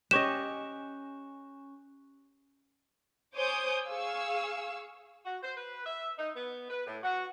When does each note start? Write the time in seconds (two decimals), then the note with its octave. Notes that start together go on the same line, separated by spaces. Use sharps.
0.11 C#4 G4 C#5 D#5 C#6 F#6 E7
3.36 C5 C#5 G#5 D6 D#6 G6
3.88 G#4 F5 C#6 E6
5.24 F#4
5.43 C5
5.55 B4
5.85 E5
6.17 D#4
6.35 B3
6.69 B4
6.86 A2
7.03 F#4